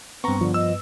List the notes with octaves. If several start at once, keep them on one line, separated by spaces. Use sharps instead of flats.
G2 B3 C4 A#5 C#6
D3 F3
D#5 E6